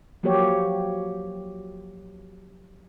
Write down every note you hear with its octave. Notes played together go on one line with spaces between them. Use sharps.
F3 F#3 A#3 F#4 G4 C#5